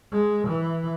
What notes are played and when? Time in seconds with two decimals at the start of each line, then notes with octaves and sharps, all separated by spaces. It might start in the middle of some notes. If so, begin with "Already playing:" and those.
0.12 G#3
0.48 E3